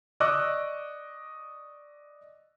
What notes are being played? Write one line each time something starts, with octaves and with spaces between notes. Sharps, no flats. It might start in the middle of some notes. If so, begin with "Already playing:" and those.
D5 D#5 C#6 D6 E6 F#6